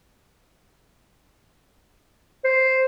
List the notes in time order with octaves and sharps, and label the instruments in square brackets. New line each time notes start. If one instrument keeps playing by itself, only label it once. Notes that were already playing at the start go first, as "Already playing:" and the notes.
[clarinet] C5